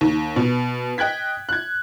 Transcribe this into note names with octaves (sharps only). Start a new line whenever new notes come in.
D#2
B2
D#5 G5 F#6 G#6 B6
F#6 G#6